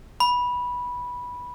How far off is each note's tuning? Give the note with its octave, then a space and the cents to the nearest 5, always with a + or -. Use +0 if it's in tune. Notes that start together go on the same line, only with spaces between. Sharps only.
B5 -10